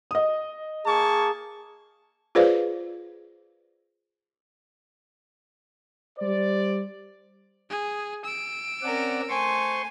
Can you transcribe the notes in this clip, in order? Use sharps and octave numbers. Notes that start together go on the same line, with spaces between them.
D#5 D#6
A#3 G#4 A5 C#6
F4 G#4 B4 C5 D5 F5
G3 C5 D5
G#4
E6 D7
C4 C#4 A#4 D5 F#5
A3 C5 G#5 C6 C#6